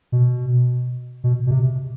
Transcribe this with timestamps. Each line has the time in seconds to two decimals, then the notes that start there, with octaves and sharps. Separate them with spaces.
0.12 B2
1.24 B2
1.47 B2
1.51 C3